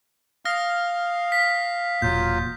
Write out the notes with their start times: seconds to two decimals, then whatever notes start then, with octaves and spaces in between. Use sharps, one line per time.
0.45 F5 D#6 F6 A#6
1.32 B6
2.02 E1 A#2 F#3 F4 G6